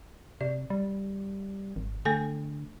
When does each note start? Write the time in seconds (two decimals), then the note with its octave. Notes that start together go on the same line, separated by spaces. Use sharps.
0.41 C3 D5
0.70 G3
1.76 G#1
2.05 D3 A3 A4 G#5